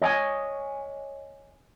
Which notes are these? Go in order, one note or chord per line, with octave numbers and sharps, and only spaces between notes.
C#5 D#5 G5 G#5